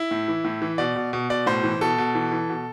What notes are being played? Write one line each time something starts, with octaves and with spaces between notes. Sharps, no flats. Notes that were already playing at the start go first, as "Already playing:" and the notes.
Already playing: E4
A2
E3
A2
E3
B2 D5
B2
B2
B2 D5
A2 C5
E3
B2 A4
B2
E3
E3
B2